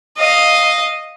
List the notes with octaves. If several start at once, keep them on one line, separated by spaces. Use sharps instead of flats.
D#5 F5